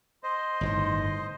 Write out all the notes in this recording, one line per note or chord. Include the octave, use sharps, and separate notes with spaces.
C5 D#5 C6
G1 A2 D#3